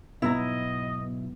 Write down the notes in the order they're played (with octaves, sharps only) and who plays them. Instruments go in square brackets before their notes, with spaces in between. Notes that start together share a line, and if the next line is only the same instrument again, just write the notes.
[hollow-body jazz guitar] B1 G#2 A#5 [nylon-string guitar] B3 [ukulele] E4 [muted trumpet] D#5